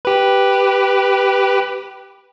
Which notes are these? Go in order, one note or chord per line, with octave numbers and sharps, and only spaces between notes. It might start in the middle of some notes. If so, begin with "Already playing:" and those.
G4 B4